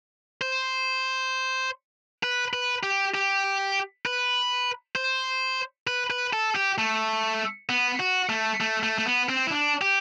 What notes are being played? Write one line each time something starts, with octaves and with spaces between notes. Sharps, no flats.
C5
B4
B4
G4
G4
B4
C5
B4
B4
A4
G4
A3
B3
F#4
A3
A3
A3
A3
B3
C4
E4
D4
G4